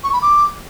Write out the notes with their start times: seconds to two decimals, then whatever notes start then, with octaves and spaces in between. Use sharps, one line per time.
0.04 C#6
0.13 B5
0.22 D6